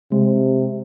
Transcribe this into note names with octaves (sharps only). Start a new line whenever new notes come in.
C3 G#3